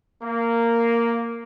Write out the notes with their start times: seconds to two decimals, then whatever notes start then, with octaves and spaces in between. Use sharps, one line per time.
0.23 A#3